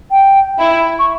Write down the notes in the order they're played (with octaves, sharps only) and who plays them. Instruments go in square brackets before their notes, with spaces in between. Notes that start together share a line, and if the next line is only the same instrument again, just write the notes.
[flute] G5
[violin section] E4
[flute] C#6